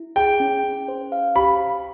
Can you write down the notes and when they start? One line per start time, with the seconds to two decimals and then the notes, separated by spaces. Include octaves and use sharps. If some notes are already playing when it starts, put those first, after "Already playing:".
Already playing: E4
0.16 G#4 G5
0.40 C#4
0.64 C#4
0.88 C5
1.12 F5
1.36 G4 B5